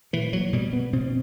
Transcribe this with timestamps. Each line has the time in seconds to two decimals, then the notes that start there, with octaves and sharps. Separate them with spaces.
0.13 A#2 E3
0.33 F#3
0.53 B2 G3
0.73 B3
0.93 B2 C4